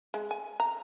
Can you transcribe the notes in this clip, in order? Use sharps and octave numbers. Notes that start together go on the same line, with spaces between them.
G#3
G#5
A#5